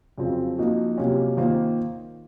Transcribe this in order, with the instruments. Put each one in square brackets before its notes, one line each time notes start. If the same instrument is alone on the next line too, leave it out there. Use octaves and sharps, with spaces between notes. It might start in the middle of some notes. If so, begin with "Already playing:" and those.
[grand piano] F2 C#3 F#3 C4 F4
F3 A#3 D#4 F#4
C3 F#3 A#3 C#4 F4
D#3 A#3 F4 C5